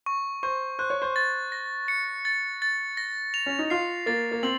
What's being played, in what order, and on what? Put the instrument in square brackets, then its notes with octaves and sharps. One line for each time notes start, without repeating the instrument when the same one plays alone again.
[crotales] C#6
[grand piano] C5 [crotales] C#6
[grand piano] C5 [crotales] F#6
[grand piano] C#5
C5
[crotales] A6
A#6
C#7
A6
A6
A#6
F7
[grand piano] C#4
D#4
[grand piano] F4 [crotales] C7
[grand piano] A#3 [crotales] A6
[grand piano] A#3
[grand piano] C4 [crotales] F#7